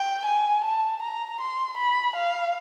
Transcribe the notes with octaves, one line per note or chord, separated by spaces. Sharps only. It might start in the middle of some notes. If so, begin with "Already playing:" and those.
Already playing: G5
G#5
A5
A#5
C6
B5
F5